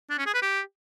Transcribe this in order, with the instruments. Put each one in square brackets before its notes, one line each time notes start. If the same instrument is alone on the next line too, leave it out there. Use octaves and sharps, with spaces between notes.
[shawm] D4
C#4
G#4
B4
G4